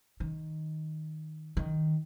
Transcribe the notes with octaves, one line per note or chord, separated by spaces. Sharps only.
D#3
D#3